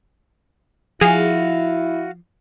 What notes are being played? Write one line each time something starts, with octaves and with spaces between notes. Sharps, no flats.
F3 E4 F#4 G#4 F5